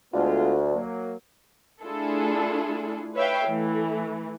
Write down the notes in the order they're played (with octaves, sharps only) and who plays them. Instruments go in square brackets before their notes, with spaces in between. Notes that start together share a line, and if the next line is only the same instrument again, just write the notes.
[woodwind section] D2 [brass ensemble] G#3 B3 F4
[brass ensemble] F#3 A#3
[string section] A3 D4 E4 F4 G#4 A4
B4 C#5 E5 F5 G5
E3 A3